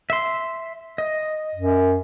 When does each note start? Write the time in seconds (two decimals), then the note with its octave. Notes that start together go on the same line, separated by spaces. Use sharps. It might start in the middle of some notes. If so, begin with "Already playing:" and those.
0.10 E5 C6
0.98 D#5
1.55 F#2